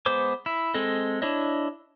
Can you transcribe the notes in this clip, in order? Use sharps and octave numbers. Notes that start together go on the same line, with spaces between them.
G#3 B3 C5 D6
E4
G#3 C4 A4 D#5
D4 E4 C#5 D#5